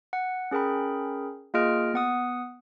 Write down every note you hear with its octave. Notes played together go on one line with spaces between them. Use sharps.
F#5
C#4 G#4 A#4 G5 B5
A#3 F4 G#4 D#5 F6 D7
B3 F#5 D#6